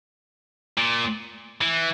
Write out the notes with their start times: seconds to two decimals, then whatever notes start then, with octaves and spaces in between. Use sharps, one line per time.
0.77 A#2
1.61 E3